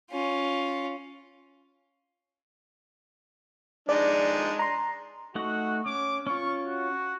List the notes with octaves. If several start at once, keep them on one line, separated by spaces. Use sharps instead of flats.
C#4 F4
G#3 D4 D#4 D5
A#5 C6
A3 D#4 F#4 F#5
C#4 D6
C#4 F4 C#6
F#4